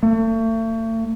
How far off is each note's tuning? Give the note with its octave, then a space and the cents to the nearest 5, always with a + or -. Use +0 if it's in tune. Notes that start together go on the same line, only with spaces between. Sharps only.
A3 +40